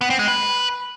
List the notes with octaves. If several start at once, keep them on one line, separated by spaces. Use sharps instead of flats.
B3
C4
G#3
B4